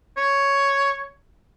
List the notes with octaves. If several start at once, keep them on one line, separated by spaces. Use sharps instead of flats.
C#5